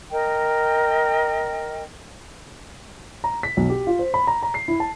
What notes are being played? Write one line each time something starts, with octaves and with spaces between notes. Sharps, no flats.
A#4 D#5 G5
A#5
B6
B1
G4
F4
C5
B5
A#5
A#5
C7
E4
A5